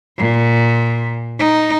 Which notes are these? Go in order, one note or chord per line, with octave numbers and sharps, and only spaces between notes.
A#2
D#4